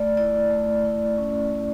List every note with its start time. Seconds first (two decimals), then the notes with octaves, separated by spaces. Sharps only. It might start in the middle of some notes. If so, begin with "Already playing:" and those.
Already playing: A3 D5
0.17 E4 D5
0.51 A3
0.85 E4
1.18 C#4
1.51 E4